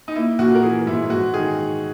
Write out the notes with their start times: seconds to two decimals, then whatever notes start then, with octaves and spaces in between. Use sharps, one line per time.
0.08 D#4
0.15 A#3 E4
0.39 A#2 F#4
0.55 A#4
0.63 E3 G#4
0.87 G#2 E4
1.10 G#2 F#4
1.34 D#3 G#4